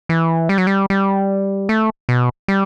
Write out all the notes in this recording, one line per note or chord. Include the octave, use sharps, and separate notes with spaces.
E3
G3
F#3
G3
G3
A3
B2
G3